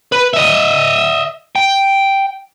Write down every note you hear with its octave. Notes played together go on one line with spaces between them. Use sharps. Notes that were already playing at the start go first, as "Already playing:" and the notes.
B4
D#5 E5
G5